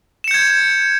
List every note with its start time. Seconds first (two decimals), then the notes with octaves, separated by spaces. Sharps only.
0.24 E7
0.28 C#7
0.31 G6
0.34 G#6